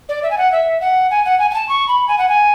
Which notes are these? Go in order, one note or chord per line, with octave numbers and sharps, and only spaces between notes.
D5
E5
G#5
F#5
E5
F#5
G#5
F#5
G#5
G#5
A5
C#6
B5
G#5
F#5
G#5